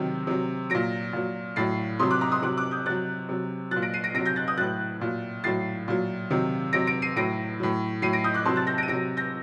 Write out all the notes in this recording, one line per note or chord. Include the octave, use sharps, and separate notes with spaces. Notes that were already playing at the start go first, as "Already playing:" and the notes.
Already playing: C3 D#3 F#3
C3 F#3
A#2 F#3 A#6 D7
A#2 F#3
A2 F#3 A6 C7
C3 F#3 C6 D#6
D6 F#6
A#5 D6
C6 D#6
C3 F#3 D6 F#6
D6 F#6
D#6 G6
C3 F#3 F#6 A6
C3 F#3
A#2 F#3 F#6 A6
A#6 D7
C7 D#7
A#6 D7
C3 F#3 A#6 D7
G6 A#6
F#6 A6
D#6 G6
A2 F#3 F#6 A6
A#2 F#3
A2 F#3 A6 C7
A#2 F#3
C3 D#3 F#3
C3 F#3 A#6 D7
A#6 D7
C7 D#7
A2 F#3 A#6 D7
A2 F#3
A2 F#3 C7 D#7
A#6 D7
D#6 G6
D6 F#6
C3 F#3 A5 C6
F#6 A6
G6 A#6
A#6 D7
D#7
C3 F#3 A#6 D7
G6 A#6